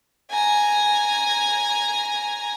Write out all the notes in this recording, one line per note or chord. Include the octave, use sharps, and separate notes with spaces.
G#5 A#5